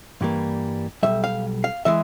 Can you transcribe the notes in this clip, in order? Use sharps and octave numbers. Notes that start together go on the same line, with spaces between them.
G2 E3 G3 A#3
B1 A#2 G3 E5
F5
F5
E3 G#3 E5